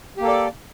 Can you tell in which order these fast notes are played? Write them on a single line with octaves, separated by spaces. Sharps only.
G4 A#3 A4 D5